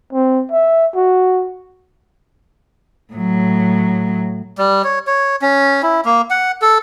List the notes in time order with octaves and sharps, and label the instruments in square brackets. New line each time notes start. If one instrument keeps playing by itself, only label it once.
[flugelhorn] C4
E5
F#4
[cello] A2 F#3
[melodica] G3
C#5
C#5
C#4
E4
A#3
F#5
A4